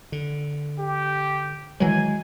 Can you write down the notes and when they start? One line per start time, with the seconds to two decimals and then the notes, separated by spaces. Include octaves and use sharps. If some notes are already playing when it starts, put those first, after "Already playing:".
0.12 D3
0.79 G4
1.80 D#3 E3 F#3 G#3 G#5